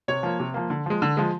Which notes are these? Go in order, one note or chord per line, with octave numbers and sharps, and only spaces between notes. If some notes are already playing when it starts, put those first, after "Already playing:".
C3 C#5
F3 A#3
C3
F3 A#3
D3
F3 G#3
D3
F3 G#3